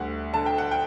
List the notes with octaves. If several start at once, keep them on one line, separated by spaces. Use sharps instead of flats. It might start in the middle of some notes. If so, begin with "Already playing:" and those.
Already playing: D2 G3 F#5
D3 A5
G5
F#5
G5